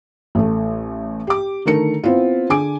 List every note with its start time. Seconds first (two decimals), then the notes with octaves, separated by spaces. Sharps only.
0.35 A1 A3
1.27 G4 D6
1.65 D3 D#3 A3 A#4 C#7
2.04 B3 C4 E4 F4
2.49 D3 G#4 G#5 D6 D7